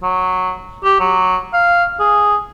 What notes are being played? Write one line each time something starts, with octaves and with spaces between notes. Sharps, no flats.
F#3
G4
F#3
F5
G#4